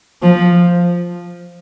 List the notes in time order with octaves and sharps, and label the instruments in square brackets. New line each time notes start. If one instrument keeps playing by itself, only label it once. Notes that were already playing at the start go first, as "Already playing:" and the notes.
[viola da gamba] F3